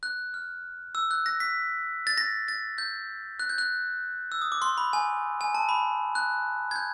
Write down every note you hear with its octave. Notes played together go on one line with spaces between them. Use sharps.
F#6
F6
E6
F#6
A#6
B6
A6
A#6
A6
G6
F#6
G6
F#6
E6
D#6
D6
C6
B5
G#5
G#5
A5
B5
F#6
G#6
G6